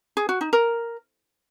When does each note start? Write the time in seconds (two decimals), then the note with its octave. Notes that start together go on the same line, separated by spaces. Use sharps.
0.17 G#4
0.29 F#4
0.41 D#4
0.53 A#4